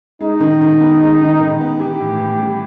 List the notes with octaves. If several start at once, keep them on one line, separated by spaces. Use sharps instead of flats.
G#3 D#4
D#3
D#3
B3
G#3
D#3
D#3
B3
E3 G4
A2
A2
G3